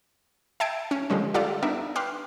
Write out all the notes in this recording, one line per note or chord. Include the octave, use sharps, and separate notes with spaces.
E5 G5 A5 G#6 C7 D7
C#4
D3 F3 G3 G#3 C#4
F4 G4 A4 D5 F5
B3 D4 D#4 A#4 E5
B4 G5 C6 D6 F6 F#6